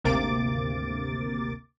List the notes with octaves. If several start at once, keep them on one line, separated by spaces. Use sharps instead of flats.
G#1 D2 C3 A#3 D6 A6